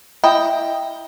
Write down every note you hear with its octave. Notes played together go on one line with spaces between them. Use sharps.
E4 D#5 G5